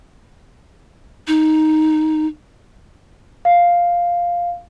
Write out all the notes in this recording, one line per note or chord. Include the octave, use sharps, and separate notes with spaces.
D#4
F5